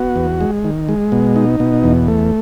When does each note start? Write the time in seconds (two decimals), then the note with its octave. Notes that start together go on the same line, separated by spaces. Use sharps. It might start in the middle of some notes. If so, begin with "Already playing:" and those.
Already playing: B3 F#4
0.16 E2
0.41 G#3
0.64 D#3
0.89 G#3
1.12 B2
1.36 D#4
1.60 B2
1.84 E2
2.08 A3